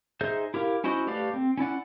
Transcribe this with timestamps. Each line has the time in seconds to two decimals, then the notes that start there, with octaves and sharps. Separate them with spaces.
0.21 D#4 G#4 C5 E5 G6
0.54 E4 G4 A#4 F5
0.84 C#4 E4 F#4 C5 D#5
1.07 A3 G4 B4 D5 F5
1.34 C4
1.58 C#4 E4 D5 F#5